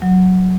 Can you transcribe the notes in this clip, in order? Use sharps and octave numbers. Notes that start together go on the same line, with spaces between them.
F#3